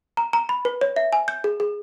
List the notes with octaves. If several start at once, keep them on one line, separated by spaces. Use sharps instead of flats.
A#5
A#5
B5
B4
C#5
E5
G#5
G6
G#4
G#4